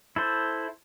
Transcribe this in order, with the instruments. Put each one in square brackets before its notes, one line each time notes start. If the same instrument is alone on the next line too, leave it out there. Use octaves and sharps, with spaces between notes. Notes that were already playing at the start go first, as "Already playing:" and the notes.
[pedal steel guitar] E4 A4 C5